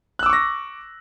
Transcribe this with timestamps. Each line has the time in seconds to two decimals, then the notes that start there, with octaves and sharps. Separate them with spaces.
0.19 F#6
0.23 E6
0.26 D6
0.29 C#6
0.33 A#6